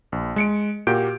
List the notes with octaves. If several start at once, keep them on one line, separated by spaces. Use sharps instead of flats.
A#1
G#3 C#7 D7
A#2 A#3 F#4 G4 G6 D7